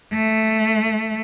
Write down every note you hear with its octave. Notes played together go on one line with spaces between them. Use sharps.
A3